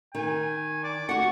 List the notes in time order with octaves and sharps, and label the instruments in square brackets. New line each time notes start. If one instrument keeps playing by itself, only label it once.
[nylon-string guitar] D#3 [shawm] G#5
[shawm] D5
[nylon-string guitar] F#4 F#5 [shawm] C#6